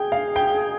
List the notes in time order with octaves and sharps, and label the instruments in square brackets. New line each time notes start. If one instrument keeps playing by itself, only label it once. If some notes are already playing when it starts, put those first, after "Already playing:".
Already playing: [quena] G#4 [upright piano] G5
[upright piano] F5
G5